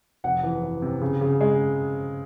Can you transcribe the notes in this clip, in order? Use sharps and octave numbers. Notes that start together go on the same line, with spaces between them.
F1 F#5
E3
E3
C3
C#3
C#3
G#3